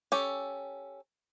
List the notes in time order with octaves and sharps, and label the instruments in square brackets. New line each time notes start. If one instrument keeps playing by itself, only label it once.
[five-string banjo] C#4 G4 A4